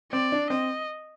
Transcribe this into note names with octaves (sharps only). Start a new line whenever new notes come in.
C4 D5
D4
C4 D#5